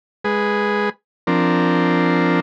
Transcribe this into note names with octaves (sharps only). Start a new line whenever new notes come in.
G#3 G#4 B4
F3 C4 D4 A#4